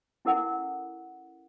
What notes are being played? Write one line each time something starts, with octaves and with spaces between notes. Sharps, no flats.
C#4 E4 A4 A#4 F#5